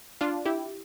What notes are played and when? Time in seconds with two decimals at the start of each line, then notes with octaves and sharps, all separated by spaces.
0.21 D4 F4
0.45 E4 G4